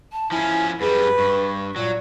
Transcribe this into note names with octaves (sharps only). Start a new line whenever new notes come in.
A5
F3 C#4 E4 G#5
F#2 G3 G#4 B4
G2 C#6
A#2 F#3